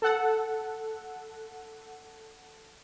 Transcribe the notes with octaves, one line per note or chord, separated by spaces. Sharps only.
A4 F#5